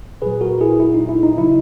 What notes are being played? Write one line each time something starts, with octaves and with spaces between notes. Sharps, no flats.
A#2 F#3 G#4 B4
F#4 A#4
E4 G#4
E4
D#4
E4
D#4
C#3 F#3 E4